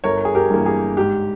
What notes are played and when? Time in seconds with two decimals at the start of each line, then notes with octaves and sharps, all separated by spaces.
0.04 G1 A#4 C#5
0.25 G#4
0.35 G4 A#4
0.50 G2 E3 A#3
0.66 G#4
0.97 G#2 G4